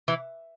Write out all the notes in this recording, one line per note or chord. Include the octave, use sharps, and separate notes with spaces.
E3